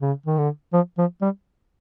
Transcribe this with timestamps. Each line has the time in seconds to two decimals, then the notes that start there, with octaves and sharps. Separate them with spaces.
0.01 C#3
0.26 D#3
0.38 D3
0.73 F3
0.98 F3
1.22 G3